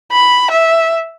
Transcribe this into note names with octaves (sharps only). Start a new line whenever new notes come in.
B5
E5